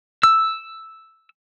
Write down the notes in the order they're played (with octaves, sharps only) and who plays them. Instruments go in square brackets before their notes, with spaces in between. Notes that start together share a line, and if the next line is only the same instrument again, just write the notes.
[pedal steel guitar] E6